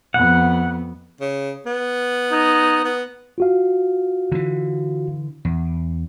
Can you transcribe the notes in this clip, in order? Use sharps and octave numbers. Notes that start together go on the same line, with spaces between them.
F2 B3 F#5
C#3
B3
D#4
B3
F4 F#4 F5
D3 E3
E2